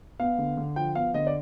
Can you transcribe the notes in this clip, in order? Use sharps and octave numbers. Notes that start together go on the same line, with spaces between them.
B3 F5
D3
D3
F3 G5
B3 F5
D3 D#5
D5